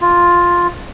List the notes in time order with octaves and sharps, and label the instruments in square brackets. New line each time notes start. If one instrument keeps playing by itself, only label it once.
[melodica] F4